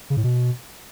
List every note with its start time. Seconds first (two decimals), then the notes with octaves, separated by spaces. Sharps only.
0.10 C#3
0.17 A2
0.24 B2